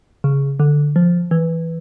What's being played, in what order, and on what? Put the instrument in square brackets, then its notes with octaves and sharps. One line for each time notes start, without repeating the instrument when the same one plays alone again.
[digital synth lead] C#3
D3
F3
E3